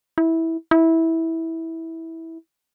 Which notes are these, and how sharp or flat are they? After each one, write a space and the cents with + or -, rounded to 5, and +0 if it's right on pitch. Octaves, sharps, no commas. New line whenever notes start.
E4 -15
E4 -15